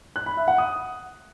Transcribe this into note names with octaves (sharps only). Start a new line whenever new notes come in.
F#6
B5
E5
F#5
D#6